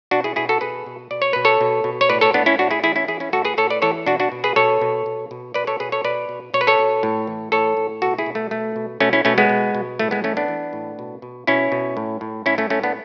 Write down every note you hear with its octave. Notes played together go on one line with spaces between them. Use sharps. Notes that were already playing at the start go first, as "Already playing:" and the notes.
B2 D4 F#4
E4 G#4
B2 E4 G#4
F#4 A4
B2 G#4 B4
B2
B2 D5
C#5
B2 B4
A4 C#5
B2
B2
C#5
A2 B4 D5
A4 C#5
A2 B3 D4
C#4 E4
A2 D4 F#4
E4 G#4
E3 E4 G#4
C#4 E4
E3 E4 G#4
C#4 E4
A2 F#4 A4
G#4 B4
A2 A4 C#5
B4 D5
E3 A4 C#5
B2 D4 F#4
D4 F#4
B2
G#4 B4
B2 A4 C#5
B2
B2
B2
B2 B4 D5
A4 C#5
B2 G#4 B4
A4 C#5
B2 B4 D5
B2
B2 C#5
B4
A4 C#5
B2
A2
E3
A2 A4 C#5
A2
B2 F#4 A4
E4 G#4
B2
A3
B2 A3
B2
B2 A3 C#4
C#4 E4
B2 A3 C#4
G#3 B3
B2
B2
A2 A3
G#3 B3
E3 A3 C#4
B3 D4
E3
A2
B2
B2
B2 C#4 E4
B2
A2
A2
A2 C#4 E4
A3 C#4
A2 A3 C#4
B3 D4